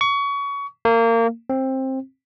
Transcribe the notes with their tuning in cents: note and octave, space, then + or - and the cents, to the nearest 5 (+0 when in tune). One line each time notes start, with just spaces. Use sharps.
C#6 +25
A#3 -25
C4 +15